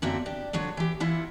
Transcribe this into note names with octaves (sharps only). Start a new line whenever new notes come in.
F#2 D3 A#3 C4 F#4 E5
D4 G4
D3 F3 F#3 C#5
E3 G4
E3 E4 F4 F#5